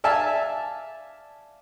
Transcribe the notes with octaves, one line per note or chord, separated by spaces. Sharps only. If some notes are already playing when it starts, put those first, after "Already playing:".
D5 E5 F5 G#5 A5